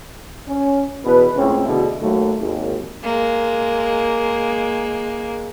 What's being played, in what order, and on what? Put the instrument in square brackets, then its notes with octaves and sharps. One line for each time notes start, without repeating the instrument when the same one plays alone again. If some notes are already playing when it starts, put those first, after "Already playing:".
[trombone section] C#4
E2 B2 B4
C#2 A2 C4 C#4
D2 B2 D3 E4 G#4
D#2 F#3 A3
G#1 D#2
[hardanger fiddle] G#3 A#3